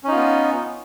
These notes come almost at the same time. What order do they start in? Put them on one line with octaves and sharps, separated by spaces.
C#4 D#4 F4 B3